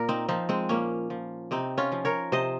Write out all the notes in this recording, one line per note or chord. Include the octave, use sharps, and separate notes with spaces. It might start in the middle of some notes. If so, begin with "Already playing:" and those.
Already playing: A#2 A#4
C4 D#4
F3 C4 D#4
G#3 C4
A#2 A#3 C#4
F3
C3 C4 D#4
C#4 F4
F3
A#4 C#5
C3 C5 D#5